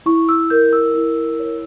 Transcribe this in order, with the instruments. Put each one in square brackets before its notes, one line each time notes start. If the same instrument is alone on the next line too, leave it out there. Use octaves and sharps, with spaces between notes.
[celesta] E4 C#6
E6
A#4 G6
E6
E4
C#5